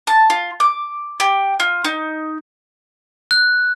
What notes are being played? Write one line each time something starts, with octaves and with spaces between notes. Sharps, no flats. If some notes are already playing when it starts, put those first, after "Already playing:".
A5
F4
D6
G4
F4
D#4
F#6